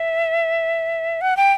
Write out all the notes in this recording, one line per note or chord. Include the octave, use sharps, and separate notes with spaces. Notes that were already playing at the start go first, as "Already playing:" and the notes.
Already playing: E5
F#5
G5